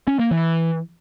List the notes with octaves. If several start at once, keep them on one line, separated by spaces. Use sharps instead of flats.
C#4
A#3
E3